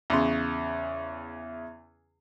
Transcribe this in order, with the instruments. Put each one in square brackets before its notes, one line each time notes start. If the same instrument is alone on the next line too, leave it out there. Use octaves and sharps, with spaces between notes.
[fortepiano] E2 C#3 C6